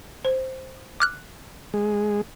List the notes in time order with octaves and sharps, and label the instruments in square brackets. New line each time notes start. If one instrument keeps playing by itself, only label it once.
[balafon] C5
[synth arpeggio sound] D6 F6 F#6
[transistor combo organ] G#3